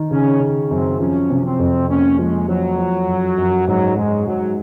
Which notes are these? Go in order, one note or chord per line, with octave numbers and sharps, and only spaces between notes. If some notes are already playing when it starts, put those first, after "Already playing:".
Already playing: D#3
C#3 C#4
C#3
F#2 C4
F3 C#4
C3
C4
F2
A#3 C#4
F3 G#3
F3 F#3
F3
F#2
F#2
G#2 F#3
G#2 G#3
G#2 F#3